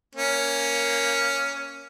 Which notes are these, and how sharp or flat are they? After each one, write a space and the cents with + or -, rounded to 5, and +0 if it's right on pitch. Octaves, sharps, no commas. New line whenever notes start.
A#3 +0 C#4 +5